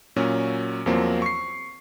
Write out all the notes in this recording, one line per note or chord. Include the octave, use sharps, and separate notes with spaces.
A#2 F#3 C#4
E2 F3 F#3 A#3 C4
C#6 C7